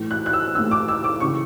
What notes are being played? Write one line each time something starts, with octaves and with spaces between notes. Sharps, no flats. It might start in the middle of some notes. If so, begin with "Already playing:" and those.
Already playing: A2 E3
F#6
F#6
E6
A2 E3 E6
D6
E6
D6
C#3 E3 C#6